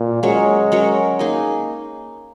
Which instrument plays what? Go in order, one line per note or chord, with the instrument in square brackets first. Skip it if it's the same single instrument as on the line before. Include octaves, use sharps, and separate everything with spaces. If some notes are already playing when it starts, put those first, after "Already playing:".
Already playing: [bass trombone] A#2
[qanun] F#3 C#4 A#4 C#5 [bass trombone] G#3
[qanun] F#3 C#4 A#4 C#5
A#3 D#4 G#4 D#5